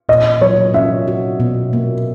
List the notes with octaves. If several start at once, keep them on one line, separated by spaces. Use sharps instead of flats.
A#2 D#5
F#3 C#5
C#4 E5
F#4
B2
A#3